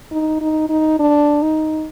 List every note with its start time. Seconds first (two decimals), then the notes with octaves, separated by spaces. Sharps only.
0.12 D#4
0.41 D#4
0.69 D#4
0.99 D4
1.43 D#4